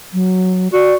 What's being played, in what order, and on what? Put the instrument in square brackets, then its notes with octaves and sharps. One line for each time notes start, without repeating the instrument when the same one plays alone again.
[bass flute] F#3
[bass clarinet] F#4 [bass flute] D5